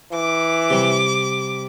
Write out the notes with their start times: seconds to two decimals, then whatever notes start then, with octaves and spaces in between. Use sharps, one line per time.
0.12 E3 D6
0.70 C3 G3